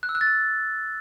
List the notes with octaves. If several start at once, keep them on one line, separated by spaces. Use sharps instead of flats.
F#6
E6
F#6
A6
F#6